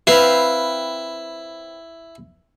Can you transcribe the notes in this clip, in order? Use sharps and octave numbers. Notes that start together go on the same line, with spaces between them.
C4 E4 B4 F5